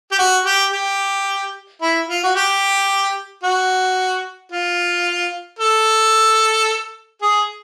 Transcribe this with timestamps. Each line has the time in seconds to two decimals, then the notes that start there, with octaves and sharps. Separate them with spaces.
0.11 G4
0.18 F#4
0.45 G4
0.73 G4
1.81 E4
2.08 F4
2.23 F#4
2.35 G4
3.43 F#4
4.52 F4
5.59 A4
7.22 G#4